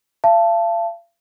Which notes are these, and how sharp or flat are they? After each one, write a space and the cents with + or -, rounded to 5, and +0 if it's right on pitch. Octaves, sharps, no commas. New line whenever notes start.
F5 -40 A5 +0